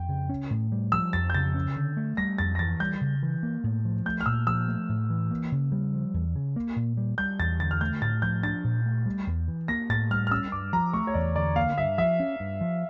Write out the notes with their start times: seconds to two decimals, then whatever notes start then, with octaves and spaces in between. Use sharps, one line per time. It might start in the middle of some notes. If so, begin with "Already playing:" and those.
Already playing: F2 G5
0.09 C#3
0.29 C#4
0.51 A2
0.72 G3
0.92 F3 E6
1.13 F2 A6
1.30 G6
1.34 C#3 A6
1.55 C#4
1.76 D3
1.97 A3
2.17 G3 A#6
2.38 F2 A6
2.55 A#6
2.59 E3 A6
2.80 G3 G6
3.01 C#3
3.23 E3
3.43 A#3
3.64 A2
3.85 F3
4.06 A3 G6
4.21 F6
4.26 A#2 E6
4.47 F3 E6
4.68 A3
4.89 A2
5.10 E3
5.31 A#3
5.52 C#3
5.72 G3
5.93 F3
6.14 E2
6.36 C#3
6.56 A#3
6.76 A#2
6.97 G3
7.18 G3 G6
7.39 E2 A6
7.60 D3 A6
7.71 F6
7.81 A3 G6
8.01 A2 A6
8.22 F3 G6
8.43 D4 A6
8.64 A#2
8.86 A3
9.06 G3
9.27 E2
9.48 E3
9.68 A#3 A#6
9.89 A2 A6
10.11 G3 F6
10.27 F6
10.31 C#4 E6
10.52 G2 D6
10.73 F3 A#5
10.93 A3 C#6
11.07 C#5
11.14 E2 D5
11.36 D3 D5
11.56 A#3 F5
11.78 G2 E5
11.98 F3 E5
12.20 C#4
12.40 G2
12.61 F3